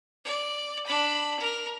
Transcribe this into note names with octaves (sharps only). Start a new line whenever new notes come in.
D5
D4 B5
A#4